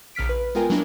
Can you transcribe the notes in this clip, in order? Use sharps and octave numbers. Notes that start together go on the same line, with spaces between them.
A#1 C#3 F6 B6 D7
B4
G#3 B3 F4 A#4 G5 G#5
F#3 G#3 A#3 D4 E4 A#4